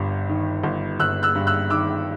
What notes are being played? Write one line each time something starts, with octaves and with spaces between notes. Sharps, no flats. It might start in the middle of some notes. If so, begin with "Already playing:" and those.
Already playing: G1 G2
D#3
G1
G1 E6 F#6
E6 F#6
G2
E6 F#6
D#3 D6 E6